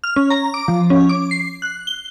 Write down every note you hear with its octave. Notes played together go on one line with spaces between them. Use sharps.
F6
C#4
A#5
D6
F3
C#4
D6
C7
F#6
G7